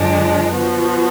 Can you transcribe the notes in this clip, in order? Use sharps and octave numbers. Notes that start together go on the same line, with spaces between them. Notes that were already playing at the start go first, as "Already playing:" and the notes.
Already playing: F#2 D3 F3 G#3 D4
F3 B3 F#4